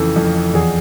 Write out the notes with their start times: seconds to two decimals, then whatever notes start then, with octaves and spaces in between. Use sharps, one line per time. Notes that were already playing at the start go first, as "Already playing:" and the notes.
Already playing: F2 C#3 E3 A4
0.16 F2
0.54 E2 G#4